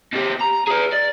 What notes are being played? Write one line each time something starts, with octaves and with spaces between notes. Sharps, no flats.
B2 G4
A#5
G#4 B4
D5